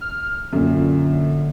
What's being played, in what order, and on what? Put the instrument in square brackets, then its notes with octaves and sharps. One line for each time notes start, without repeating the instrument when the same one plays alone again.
[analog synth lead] F6
[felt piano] F#2 A#2 [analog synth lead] D3